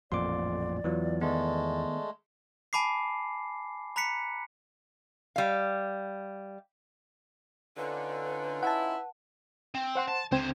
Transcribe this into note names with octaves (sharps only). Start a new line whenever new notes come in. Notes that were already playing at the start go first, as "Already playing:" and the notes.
A1 F2 A#2 D5 C6 D6
E2 E3 F#3 F4
D#3 G#3 A3 B3
G#5 A5 B5 D6 C7
A#5 B5 F#6 B6 C#7
G3 F5
D3 C#4 D#4 F4 B4
E4 F#5 A5
C4
C5 F#5 C6
A5
C#2 D3 C4 C5 G#6